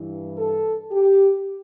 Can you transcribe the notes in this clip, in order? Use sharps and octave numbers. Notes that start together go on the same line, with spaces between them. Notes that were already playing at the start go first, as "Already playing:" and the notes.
Already playing: G2 E3
A4
G4